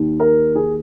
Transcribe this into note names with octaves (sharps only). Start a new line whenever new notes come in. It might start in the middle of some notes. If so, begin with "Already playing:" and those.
Already playing: D#2 D#3
A#4
G#4